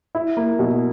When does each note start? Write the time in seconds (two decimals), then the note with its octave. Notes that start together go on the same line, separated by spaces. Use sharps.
0.15 E4
0.37 A#3
0.59 B2